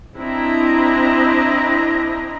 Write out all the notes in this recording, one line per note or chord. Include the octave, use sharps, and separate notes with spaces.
C4 D4 E4 D#5 A#5